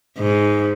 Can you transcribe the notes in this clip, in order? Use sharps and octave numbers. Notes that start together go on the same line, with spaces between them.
G#2